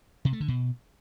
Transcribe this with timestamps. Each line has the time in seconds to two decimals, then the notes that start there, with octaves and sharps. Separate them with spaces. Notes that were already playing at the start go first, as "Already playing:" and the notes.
0.25 C3
0.33 A3
0.40 D3
0.48 B2